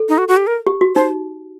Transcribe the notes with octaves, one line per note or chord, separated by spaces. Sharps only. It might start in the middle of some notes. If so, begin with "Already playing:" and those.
Already playing: A4
D#4
F#4
F#4
G4
A#4
G4
F#4
D#4 C5